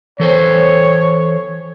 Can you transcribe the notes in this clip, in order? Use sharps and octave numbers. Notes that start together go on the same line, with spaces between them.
E3 A4 C5 C#5